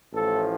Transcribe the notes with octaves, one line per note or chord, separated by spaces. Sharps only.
A1 A2 F3 A4